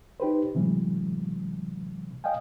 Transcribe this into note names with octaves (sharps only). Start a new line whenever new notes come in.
D#4 G4 B4 C5
A2 C3 E3 F#3 G#3
D#5 F5 G5 G#5